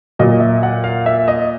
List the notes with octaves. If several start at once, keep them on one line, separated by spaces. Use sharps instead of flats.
A#2 F#3 D#5
E5
F#5
F5
E5
D#5